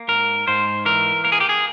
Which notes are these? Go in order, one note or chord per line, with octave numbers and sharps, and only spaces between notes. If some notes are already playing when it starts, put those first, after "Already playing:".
Already playing: A#3
G#2 A#4
G#2 C5
E3 A#4
A#3 A#4
G#4
G4
G#4